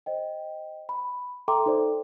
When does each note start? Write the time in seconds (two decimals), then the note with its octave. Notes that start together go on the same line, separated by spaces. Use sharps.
0.06 C5 D#5 G5
0.89 B5
1.48 A4 E5 G5 A#5 C6 D6
1.66 D#4 A4 C5 D5